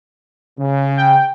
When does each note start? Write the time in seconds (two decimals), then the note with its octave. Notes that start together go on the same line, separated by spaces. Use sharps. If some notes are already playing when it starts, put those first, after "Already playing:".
0.57 C#3
0.97 G5